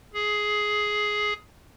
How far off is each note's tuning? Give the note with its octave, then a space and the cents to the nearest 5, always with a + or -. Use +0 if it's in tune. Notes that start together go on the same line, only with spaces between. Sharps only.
G#4 +10